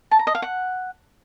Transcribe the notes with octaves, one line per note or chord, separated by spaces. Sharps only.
A5
A#5
D#5
F5
F#5